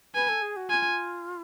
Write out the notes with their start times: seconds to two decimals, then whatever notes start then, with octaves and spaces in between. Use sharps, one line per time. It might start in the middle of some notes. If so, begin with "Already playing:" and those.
0.15 B4 G#5
0.29 A4
0.42 G#4
0.56 F#4
0.70 F4 G#5